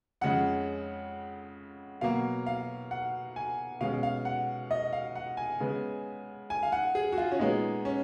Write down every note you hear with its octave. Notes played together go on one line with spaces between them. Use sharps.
F2 C#3 G#3 C#4 F#5
B2 F#3 A#3 F5
F5
F#5
G#5
B2 G#3 C#4 F5
F5
F#5
D#5
F5
F#5
G#5
C#3 G#3 B3
G#5
F5
F#5
G#4
F#4
F4
C#4
A#2 G#3 B3 D#4
C#4